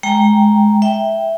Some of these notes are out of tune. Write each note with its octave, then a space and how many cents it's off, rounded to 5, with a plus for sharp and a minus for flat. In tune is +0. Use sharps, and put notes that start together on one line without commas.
G#3 +20 G5 +0 A#5 +0
E5 +0 G5 +0